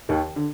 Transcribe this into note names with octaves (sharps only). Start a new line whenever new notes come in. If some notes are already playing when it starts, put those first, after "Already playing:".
D#2 D#3
D3